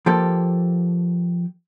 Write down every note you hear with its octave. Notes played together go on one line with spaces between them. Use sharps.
F3 A#3 G4 A4